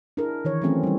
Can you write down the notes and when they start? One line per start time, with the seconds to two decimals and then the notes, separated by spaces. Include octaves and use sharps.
0.17 D4 E4 G#4 A#4
0.45 D#3 E3 C#5
0.61 E3 F#3 A3 C4 C#4 G#4
0.83 G3 E4